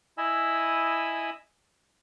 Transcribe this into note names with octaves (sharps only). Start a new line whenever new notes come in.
E4 D#5 G#5 B5 E6